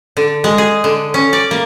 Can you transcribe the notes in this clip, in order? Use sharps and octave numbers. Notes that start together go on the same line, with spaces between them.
D3
G#3
G#4
D3
C#4
D5
A#3